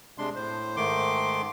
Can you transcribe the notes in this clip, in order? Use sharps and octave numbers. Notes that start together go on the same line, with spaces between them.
C3 G#3 D4 C6
A2 C5
G#2 D#3 A3 C6 D6